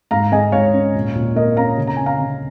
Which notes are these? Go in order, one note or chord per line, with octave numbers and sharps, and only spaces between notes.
G#2 F5 A#5
G#3 D#5 G#5
G#2 C#5 F5
C#4
A#2
A#2
A#3 A#4 D#5
C#4 F5 A#5
C#3
A#5
C#4 G#5
F5 A#5
C#3